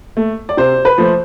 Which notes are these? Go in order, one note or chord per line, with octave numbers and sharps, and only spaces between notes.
A3
D5
C3 C5
B4
F3 A3 C5